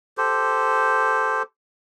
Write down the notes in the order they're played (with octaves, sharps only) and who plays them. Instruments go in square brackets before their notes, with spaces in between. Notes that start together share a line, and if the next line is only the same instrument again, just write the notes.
[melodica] G4 A4 C5